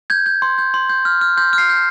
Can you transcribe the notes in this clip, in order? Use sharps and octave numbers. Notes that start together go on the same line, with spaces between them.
G6 G#6
G6
C6
G6
C6
G6
F6
F6
C6 G6
F6
C7
G6